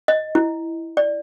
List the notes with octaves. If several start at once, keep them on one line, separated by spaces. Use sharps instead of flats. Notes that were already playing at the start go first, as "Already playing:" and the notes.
D#5
E4
D5